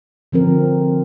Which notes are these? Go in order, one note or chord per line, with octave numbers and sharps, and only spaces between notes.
D3 F3 C4 A#4